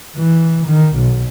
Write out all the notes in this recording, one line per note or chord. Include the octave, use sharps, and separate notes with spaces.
E3
D#3
B1